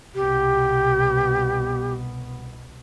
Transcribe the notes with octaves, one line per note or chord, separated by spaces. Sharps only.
C2 B2 B3 G4